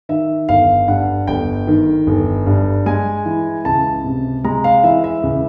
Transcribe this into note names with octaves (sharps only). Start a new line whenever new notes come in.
D#3 E5
G1 F5
G2 F#5
G1 G5
D#3
G1
G2
G#3 G#5
E3
C#2 A5
C3
G#3 A#5
F5
E3 E5
E5
C#2